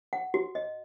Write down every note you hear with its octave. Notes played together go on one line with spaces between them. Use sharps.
F#5
F#4
D#5